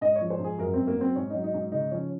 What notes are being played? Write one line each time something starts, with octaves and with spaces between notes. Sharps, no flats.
G#2 D#5
C#5
F3
C5
G#2 G#4
F#2 A#4
F#2 C4
A#3
F#3 C4
G#2 C#4
F#3 D#4
D#4
G#2
C#3 D#4
F3 C#4